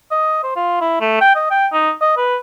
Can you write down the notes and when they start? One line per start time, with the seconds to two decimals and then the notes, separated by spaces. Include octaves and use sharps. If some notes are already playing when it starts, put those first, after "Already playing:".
0.11 D#5
0.43 C5
0.56 F4
0.81 E4
1.01 A3
1.21 G5
1.36 D#5
1.51 G5
1.73 D#4
2.01 D#5
2.17 B4